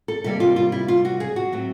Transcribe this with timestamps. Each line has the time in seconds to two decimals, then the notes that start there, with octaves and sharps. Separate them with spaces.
0.08 A4
0.24 C3 D#3 G3 A#3 A4
0.40 F4
0.56 F4
0.72 E4
0.88 F4
1.05 F#4
1.20 G#4
1.36 F#4
1.52 A2 F#3 A3 C4